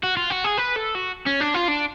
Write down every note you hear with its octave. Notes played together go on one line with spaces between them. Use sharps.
F#4
F4
F#4
G#4
B4
A4
F#4
C#4
D4
F4
D4